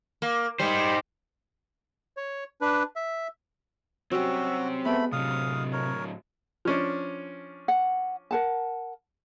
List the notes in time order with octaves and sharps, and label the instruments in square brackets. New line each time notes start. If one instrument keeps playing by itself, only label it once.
[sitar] A#3
[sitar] G3 [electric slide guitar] D#4 C5
[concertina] C#5
D4 B4
E5
[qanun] F#3 G3 C#4 [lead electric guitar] C4 G4 [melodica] F#4 [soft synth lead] E6
[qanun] G#3 [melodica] A3 B5 [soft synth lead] B3
[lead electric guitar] A2 F#3 [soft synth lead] C3 [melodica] F5 D#6
[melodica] A#4 C#5
[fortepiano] F3 C#4 D4
[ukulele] F#5
A#4 F#5 A5